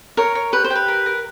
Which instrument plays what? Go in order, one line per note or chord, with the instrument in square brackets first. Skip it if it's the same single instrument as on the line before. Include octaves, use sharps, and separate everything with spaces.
[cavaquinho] A#4 [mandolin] C#5
[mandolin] C#5
[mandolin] G4 [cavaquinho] B4
[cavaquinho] C5
[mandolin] G4
[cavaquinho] B4
[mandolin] A#4
A#4